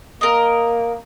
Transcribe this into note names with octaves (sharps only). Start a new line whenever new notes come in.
A#3 A#4 D#5